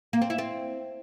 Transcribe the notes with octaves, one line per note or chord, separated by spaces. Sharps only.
A#3
C4
E4
C4